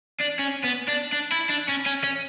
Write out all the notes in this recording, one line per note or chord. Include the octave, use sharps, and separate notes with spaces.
D4
C#4
B3
D4
D4
E4
D4
C#4
C#4
C#4